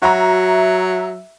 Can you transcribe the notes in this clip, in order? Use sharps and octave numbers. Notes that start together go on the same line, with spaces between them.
F#3 F#4 E5 A#5